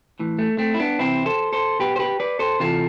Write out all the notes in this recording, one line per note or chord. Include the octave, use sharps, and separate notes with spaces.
A2 E3
A3
A3 C4
E4
B3 D4
C3 E3 C4 E4
A4 C5
A4 C5
B2 G4 B4
C5
G4 B4
B4 D5
A4 C5
C3 E3 F4 A4